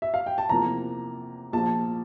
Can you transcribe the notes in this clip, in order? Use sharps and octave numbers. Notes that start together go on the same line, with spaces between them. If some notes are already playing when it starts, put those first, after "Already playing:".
E5
F5
G5
A5
E2 C3 F3 A#3 A#5
A#1 A#2 F3 A5